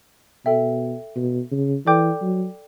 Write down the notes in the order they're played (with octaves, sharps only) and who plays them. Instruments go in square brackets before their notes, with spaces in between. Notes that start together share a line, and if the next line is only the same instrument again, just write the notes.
[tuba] B2 [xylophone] A4 E5 G5
[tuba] B2
C#3
[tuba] E3 [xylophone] A4 D5 G5 D6 G6
[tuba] F#3